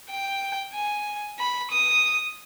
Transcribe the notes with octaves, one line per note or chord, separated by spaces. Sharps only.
G5
G#5
B5
D#6